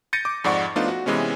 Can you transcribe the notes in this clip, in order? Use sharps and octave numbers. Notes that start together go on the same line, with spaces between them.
G6 A6 A#6 C#7 D#7
D6
F2 G#2 D5 F#5 C#6
F3 A3 B3 D4 D#4 F4
F#4
C3 E3 G#3 B3 C#4